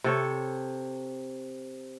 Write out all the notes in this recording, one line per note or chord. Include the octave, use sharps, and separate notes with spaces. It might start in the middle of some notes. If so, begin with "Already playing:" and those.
C3 A4 C#5